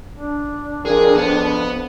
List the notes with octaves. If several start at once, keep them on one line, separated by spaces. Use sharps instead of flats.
D4
F2 G#4 A#4
F2 B3